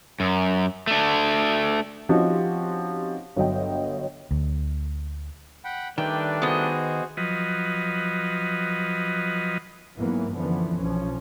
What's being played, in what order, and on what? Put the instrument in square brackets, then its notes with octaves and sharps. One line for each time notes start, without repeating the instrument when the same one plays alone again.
[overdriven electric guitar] F#2
A3 D4
[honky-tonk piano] F3 C4 C#4 D#4 F#4 G4
G1 F#3 D#5 G5
[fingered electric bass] D2
[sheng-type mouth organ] F#5 G5 B5
[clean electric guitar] D#3 [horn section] G3 A3 D4 [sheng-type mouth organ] B4 D5 [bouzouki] G5
[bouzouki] B3 D#5 [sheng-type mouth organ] F#4 G#4 C5
[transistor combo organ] F3 F#3 B4 D#5
[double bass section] G#2 E3 F#3 A#3 B3
F#2 D3 E3 F3 B3
B1 F3 C#4